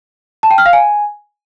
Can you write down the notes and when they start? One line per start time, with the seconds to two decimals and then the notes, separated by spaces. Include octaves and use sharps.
0.43 A5
0.51 G5
0.58 F6
0.66 F5
0.73 G#5